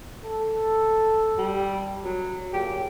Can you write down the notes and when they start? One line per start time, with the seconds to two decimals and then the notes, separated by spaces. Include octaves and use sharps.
0.24 A4
1.38 G3
2.04 F#3
2.53 A#2 F#3 G4 G#4